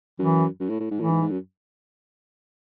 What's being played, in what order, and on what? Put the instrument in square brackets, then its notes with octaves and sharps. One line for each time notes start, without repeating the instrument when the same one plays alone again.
[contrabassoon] F#2 [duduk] E3
[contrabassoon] F#2
A2
A2
G#2
[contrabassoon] A2 [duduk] E3
[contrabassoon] G#2
G#2
F#2